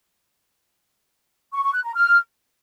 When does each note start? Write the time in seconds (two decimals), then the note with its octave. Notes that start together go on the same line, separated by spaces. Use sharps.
1.53 C#6
1.63 C#6
1.74 F#6
1.84 A#5
1.95 F6